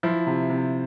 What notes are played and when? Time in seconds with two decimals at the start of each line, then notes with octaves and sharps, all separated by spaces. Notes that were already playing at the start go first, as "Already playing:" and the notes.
0.03 F3 E4
0.27 C3
0.50 C3